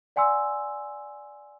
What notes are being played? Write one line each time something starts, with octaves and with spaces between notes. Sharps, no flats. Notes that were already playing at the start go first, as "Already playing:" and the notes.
D5 F#5 G#5 C6 E6